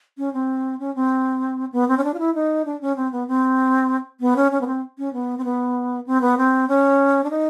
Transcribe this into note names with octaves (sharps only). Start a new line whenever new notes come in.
C#4
C4
C#4
C4
B3
C4
C#4
D4
F4
E4
D#4
D4
C#4
C4
B3
C4
B3
C#4
C#4
B3
C4
C#4
B3
C4
B3
C4
B3
C4
C#4
D4
D#4